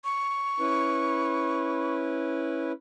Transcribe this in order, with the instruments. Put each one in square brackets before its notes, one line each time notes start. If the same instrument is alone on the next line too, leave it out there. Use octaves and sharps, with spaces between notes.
[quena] C#6
[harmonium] C#4 E4 B4